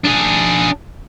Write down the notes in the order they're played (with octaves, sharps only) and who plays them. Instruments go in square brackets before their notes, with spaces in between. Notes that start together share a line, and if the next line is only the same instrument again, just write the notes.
[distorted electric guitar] D4 G#4